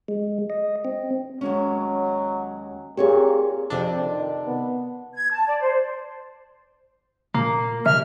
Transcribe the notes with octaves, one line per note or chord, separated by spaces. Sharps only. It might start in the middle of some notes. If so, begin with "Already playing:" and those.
G#3
D#5
C4
D#2 F#3 G#3 C#4
A#2 C4 G4 G#4 C#5
F2 C3 D4
D#3
B3
G#6
A5
D5
C5
A#2 A#3
C3 E5 F6